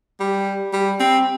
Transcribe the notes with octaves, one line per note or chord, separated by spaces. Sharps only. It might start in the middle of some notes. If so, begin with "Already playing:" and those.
G3
G3
C4